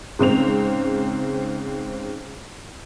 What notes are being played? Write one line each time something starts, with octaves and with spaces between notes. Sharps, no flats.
G#2 C#3 C4 F7